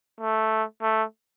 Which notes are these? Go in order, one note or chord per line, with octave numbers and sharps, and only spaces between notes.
A3
A3